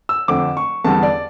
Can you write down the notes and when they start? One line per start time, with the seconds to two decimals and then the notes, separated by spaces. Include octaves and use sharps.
0.09 E6
0.28 F2 D3 A3 D6
0.57 C#6
0.84 E2 D3 G3 A5
1.03 D5